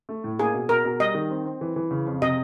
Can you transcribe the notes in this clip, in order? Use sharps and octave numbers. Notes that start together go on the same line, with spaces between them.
A3
A2
A#3 G#4
B2
B2 A#4
B2
G3 D#5
D#3
C4
C4
E3
E3
C#3
F2
C3 D#5